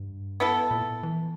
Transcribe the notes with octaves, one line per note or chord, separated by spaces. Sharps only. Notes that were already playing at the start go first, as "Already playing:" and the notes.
Already playing: G2
B3 E4 A4
A#2
E3